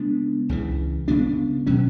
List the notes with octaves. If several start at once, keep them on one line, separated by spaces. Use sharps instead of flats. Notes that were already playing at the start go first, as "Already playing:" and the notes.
Already playing: C#3 G#3 B3 D4
C#2 C#3 E3
C#3 G#3 B3 D4
B2 F#3 C#4